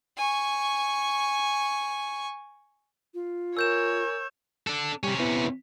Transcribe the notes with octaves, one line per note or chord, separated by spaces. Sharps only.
G#5 C#6
F4
A#4 C#5 G#5 E6 G6 E7
D4 A4
C3 G3 C#4
B3 E4